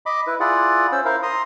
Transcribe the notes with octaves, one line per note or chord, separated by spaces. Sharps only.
D#5 B5 D6
E4 B4
E4 F4 G#4 D5 F#5
C#4 C5 E6
E4 A#4 C5 F5
A#5 C6 D#6